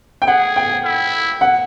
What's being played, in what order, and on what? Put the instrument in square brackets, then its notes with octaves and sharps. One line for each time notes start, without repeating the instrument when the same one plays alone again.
[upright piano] G5
[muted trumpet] G#4 [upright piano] F#5
[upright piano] G5
[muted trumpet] E4
[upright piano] F#5